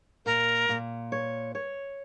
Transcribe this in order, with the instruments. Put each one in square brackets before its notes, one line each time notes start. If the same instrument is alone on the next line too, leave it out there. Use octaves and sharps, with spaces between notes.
[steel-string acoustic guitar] A#2 [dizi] A#4
[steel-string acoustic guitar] A#2
C#5
C#5